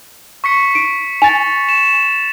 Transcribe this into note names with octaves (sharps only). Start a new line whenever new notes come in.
C#6 B6 C#7
D7
G#5 A6 F7
E7